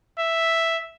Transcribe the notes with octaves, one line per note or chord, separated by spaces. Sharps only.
E5